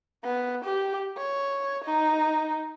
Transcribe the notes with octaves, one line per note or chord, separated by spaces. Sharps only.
B3
G4
C#5
D#4